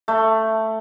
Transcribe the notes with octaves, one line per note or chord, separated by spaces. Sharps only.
A3